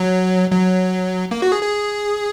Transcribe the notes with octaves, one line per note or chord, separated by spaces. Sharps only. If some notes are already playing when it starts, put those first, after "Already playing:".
Already playing: F#3
F#3
A#3
F#4
G#4
G#4